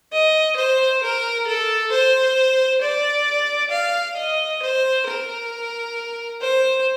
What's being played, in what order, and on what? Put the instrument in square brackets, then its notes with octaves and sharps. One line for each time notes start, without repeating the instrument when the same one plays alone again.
[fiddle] D#5
C5
A#4
A4
C5
D5
F5
D#5
C5
A#4
C5